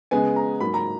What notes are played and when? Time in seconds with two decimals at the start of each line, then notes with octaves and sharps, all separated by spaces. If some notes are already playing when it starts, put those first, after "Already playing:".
0.11 C#3 G#3 B3 G#5
0.36 A#5
0.60 G#2 F#3 A#3 B5
0.74 A#5